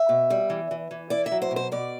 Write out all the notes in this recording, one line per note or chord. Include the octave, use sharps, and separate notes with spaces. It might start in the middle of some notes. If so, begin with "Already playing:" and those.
Already playing: E5
B2
G3
E3
E3
E3
E4 D5
E5
F#3
C5
B2
C5
B2 D5